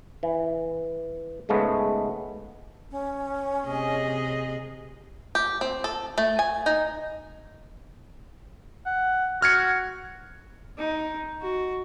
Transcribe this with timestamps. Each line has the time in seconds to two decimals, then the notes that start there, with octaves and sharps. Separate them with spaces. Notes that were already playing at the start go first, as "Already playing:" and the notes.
0.23 E3
1.49 G#2 C#3 G#3 A3 B3
2.91 C#4
3.66 C3 G#4 D#5
5.35 G4
5.61 C4
5.84 A4
6.18 A3
6.39 G#5
6.66 D#4
8.86 F#5
9.42 F#4 F6 G#6 C#7
10.78 D#4
11.41 F#4